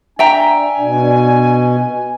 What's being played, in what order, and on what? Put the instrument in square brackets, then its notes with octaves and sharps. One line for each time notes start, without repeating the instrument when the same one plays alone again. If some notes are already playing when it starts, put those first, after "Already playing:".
[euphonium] D4 [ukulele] E5 G5 A#5 [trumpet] G#5
[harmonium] B2